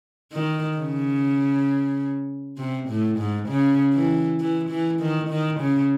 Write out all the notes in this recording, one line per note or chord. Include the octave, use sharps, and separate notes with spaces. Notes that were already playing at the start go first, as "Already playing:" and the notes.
D#3
C#3
C3
A2
G#2
C#3
E3
E3
E3
D#3
D#3
C#3